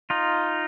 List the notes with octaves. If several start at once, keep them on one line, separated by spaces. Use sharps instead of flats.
D#4 F4